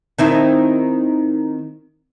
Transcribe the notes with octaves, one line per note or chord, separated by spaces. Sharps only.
D#3 C4 E4